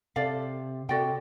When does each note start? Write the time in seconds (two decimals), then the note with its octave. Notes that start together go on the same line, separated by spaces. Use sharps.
0.16 C3 A4 D5 F5
0.89 C3 F#4 A4 D5 G5